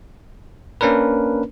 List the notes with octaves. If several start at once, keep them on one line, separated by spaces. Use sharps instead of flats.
A#3 C#4 D4 A#4 B4